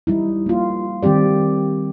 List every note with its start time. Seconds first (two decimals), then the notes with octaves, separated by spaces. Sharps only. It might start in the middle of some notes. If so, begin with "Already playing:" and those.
0.07 G3 D#4 E4
0.46 A#3 F4
1.03 D#3 G3 C4 G4 D5